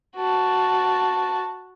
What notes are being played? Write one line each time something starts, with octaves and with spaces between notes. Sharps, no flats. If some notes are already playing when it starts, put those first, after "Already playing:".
F#4 A5